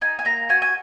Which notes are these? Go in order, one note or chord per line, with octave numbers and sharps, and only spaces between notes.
D#4 G#5
G#5
A#3 A#5
F#4 G#5
G#5